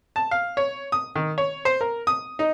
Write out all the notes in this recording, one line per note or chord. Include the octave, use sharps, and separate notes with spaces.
A5
F5
C#5
D#6
D#3
C#5
C5
A#4
D#6
D#4